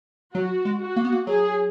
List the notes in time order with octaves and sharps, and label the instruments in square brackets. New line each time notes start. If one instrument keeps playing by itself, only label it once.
[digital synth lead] F#3 [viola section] F#4
[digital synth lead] G#3
[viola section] F#4
[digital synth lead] A#3
B3
A#3
[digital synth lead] F#3 [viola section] G#4